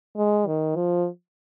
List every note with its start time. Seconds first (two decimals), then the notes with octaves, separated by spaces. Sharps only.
0.17 G#3
0.47 D#3
0.76 F3